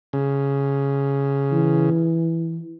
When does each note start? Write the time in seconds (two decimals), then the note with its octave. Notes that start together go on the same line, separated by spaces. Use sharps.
0.13 C#3
1.52 E3